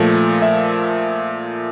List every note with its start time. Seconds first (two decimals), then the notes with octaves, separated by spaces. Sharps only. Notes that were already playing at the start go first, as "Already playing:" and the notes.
Already playing: A#2 F3 A3
0.42 E5